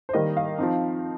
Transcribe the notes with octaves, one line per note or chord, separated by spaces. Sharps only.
C5
D#3 G3 A#3 D#5
F5
F3 C4 D#4